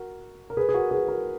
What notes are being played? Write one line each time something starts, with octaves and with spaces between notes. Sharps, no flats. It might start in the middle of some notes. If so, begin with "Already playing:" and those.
Already playing: F#4 A#4
A#4
G#4 B4
G#4
F#4 A#4
G#4 B4
F#4 A#4